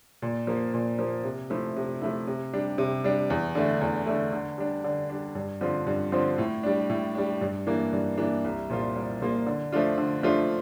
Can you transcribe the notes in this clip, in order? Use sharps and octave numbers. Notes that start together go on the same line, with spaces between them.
A#2
F3 A#3
A#2
F3 A#3
C3
F3 A3 E4
C3
F3 A3 E4
C3
G3 D4
C3
G3 D4
E2
D3 A3
E2
D3 A3
D3
G3 D4
D3
G3 D4
G2
D3 F3 C4 F4
G2
D3 F3 C4 F4
A2
G3 D4
A2
G3 D4
G2
E3 A#3 D4
G2
E3 A#3 D4
C2
A#2 F3 A#3 F4
C2
A#2 F3 A#3 F4
D3
F3 A3 D4 F4
D3
F3 A3 D4 F4